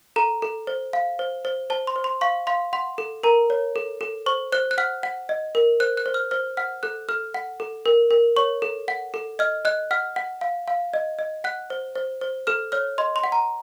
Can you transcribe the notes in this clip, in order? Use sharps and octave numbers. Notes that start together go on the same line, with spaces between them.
A4 A#5
A4
C5
F5
C5
C5
C5 A5
C6
C5
C6
F5 C#6
F5 C6
F#5 C6
A4
A#4 A#5
C#5
A4
A4
C5 C#6
C5 F#6
F#6
F#5 F6
F#5
D#5
A#4
C5 F#6
F#6
C5
F6
C5 F6
F#5 F6
A4 F#6
A4 F6
F#5
A4
A#4
A#4
C#5 C#6
A4
F#5
A4
D#5 F6
D#5 F#6
F#5 F6
F#5
F5
F5
D#5
D#5
F#5 F#6
C5
C5
C5
A4 F6
C#5 F6
D#5 C6
C6
F#5
A#5